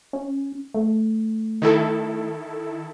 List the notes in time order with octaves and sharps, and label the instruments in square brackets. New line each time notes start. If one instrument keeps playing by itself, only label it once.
[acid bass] C#4
A3
[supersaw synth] D#3 E4 A4